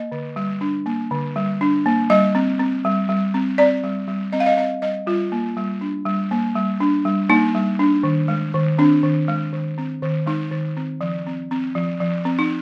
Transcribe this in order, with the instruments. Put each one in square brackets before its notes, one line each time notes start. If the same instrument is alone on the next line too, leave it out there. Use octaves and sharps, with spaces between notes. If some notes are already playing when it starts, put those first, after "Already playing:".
Already playing: [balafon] A#3 D#5
D3
G3
D4
A#3
D3
G3
D4
A#3
G3 D#5
C4
C4
G3
G3
C4
C4 D5
G3
G3
C4 D#5
F5
D#5
C4 D#5
G3 D#5
G3 F4
A#3
G3
D4
G3
A#3
G3
D4
G3
A#3 D#4
G3
D4
D#3
G#3
D#3
C4 D4
D#3
G#3
D#3
C4
D#3
G#3 D#4
D#3
C4
F3
C4
C4
F3
F3
C4
D#4